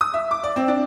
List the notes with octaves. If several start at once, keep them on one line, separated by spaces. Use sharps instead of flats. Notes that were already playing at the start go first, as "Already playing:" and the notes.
D#6
E5
D6
D5
C4
D4